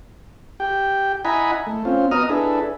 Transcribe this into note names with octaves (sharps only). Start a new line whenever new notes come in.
G4 G5
E4 D#5 F#5 G#5 A#5 B5
A3
C4 C#4 F4
B3 F#4 D#5 A#5 D#6 F6
D4 E4 G#4 A4 B4